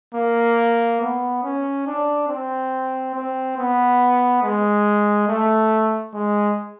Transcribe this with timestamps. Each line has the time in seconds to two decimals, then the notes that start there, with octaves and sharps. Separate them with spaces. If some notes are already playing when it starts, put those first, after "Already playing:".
0.15 A#3
1.01 B3
1.43 C#4
1.87 D4
2.28 C4
3.15 C4
3.58 B3
4.43 G#3
5.28 A3
6.14 G#3